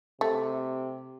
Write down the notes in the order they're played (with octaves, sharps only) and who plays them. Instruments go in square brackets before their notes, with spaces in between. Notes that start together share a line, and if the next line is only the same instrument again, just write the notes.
[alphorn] C3 [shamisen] A3